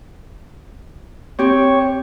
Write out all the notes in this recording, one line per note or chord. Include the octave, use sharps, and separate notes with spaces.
C4 G4 C#5